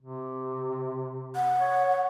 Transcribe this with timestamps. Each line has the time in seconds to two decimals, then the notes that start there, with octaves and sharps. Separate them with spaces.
0.02 C3
1.35 F#5
1.60 C#5